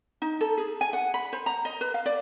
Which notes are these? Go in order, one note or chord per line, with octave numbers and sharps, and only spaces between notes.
D#4
A4
G#4
G#5
F#5
B5
C5
A#5
D#5
B4
F5
D5